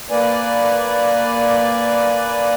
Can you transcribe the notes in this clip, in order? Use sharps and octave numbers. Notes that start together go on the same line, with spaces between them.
A#3 B4 D5 G#5